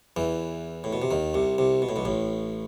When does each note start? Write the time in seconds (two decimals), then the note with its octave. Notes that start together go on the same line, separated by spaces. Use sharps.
0.17 E2 E3
0.84 A2
0.93 B2
1.02 C3
1.11 D#2 D#3
1.34 C2 C3
1.58 C2 C3
1.82 B2
1.89 A2
1.96 B1 B2
2.05 A1 A2